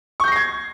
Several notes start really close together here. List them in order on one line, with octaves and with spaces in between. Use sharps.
C#6 G6 A#6 C7 G#6